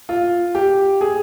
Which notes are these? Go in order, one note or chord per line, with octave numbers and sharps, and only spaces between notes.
F4
G4
G#4